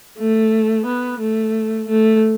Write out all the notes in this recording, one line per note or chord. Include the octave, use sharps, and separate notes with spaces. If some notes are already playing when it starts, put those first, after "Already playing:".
A3
B3
A3
A3